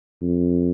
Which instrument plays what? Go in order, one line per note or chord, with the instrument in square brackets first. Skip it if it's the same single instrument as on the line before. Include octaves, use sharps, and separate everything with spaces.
[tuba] F2